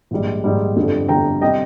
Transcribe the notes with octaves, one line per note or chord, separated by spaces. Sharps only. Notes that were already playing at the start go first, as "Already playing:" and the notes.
A#1 G#2 D#3 G3
A#1 G#2 D#3 G3
G1 F2 D3 G3
G1 F2 D3 G3 G5 A#5
C3 D#3 G3 D#5 G5